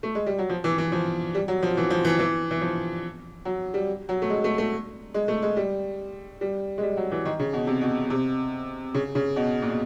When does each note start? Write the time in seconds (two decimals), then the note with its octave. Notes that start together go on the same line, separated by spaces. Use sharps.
0.03 A3
0.15 G#3
0.26 G3
0.39 F#3
0.50 F3
0.64 E3
0.78 E3
0.92 F3
1.35 G3
1.48 F#3
1.63 F3
1.77 E3
1.90 F3
2.05 E3
2.19 E3
2.51 E3
2.61 F3
3.45 F#3
3.74 G3
4.09 F#3
4.22 A3
4.30 G#3
4.44 A3
4.58 A3
5.14 G#3
5.28 A3
5.42 G#3
5.57 G3
6.41 G3
6.78 G#3
6.83 G3
6.97 F#3
7.11 E3
7.25 D#3
7.39 C#3
7.53 B2
7.67 C3
7.81 B2
8.10 C3
8.94 C#3
9.15 C#3
9.36 B2
9.62 A#2
9.70 B2